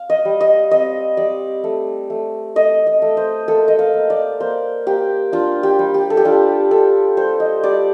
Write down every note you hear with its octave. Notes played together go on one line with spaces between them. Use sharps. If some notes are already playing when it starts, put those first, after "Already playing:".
Already playing: F5
D#5
G3
D#5
C4 D#5
G3 D5
A3
A3
A3 D#5
D#5
A3
C5
A#3 A4
D#5
F5
A#3
D5
A#3 C5
A#3 G4
D4 F4
G4
G3
G4
A4
G4
D4 F4
D4 A4
G3 C5
D#5
G3 D5